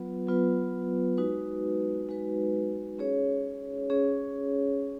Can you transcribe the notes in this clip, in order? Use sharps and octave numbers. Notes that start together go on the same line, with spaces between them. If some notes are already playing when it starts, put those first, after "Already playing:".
Already playing: F#3 B3 F4 B4
F#3 B3 F4 B4
G#3 D#4 F#4 B4
G#3 D#4 F#4 B4
C#4 G#4 C#5
C#4 G#4 C#5